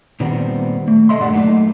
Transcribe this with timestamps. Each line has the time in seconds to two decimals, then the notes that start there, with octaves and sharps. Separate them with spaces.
0.20 A#2 D#3 G3 B3 C4
0.88 A3
1.09 C2 G#2 A4 D#5 E5 C6
1.21 G2 A#2 D3 G4 D5 F#5
1.32 F#3 A3 A#3 D#4